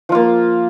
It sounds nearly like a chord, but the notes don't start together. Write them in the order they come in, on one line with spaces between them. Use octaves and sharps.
F3 F4 A#3